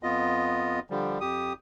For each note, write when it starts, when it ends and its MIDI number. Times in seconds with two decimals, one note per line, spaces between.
0.03 0.80 41
0.03 0.80 59
0.03 0.80 65
0.03 0.80 75
0.90 1.19 50
0.90 1.19 53
0.90 1.19 55
1.21 1.53 41
1.21 1.53 67
1.21 1.53 87